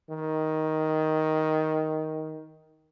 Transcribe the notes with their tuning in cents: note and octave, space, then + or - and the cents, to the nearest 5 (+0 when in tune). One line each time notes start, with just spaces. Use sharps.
D#3 +10